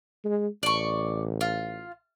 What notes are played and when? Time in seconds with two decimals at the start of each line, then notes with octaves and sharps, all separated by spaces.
0.25 G#3
0.63 A1 D5 C#6
1.41 F4